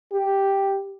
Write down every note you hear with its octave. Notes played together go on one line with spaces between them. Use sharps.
G4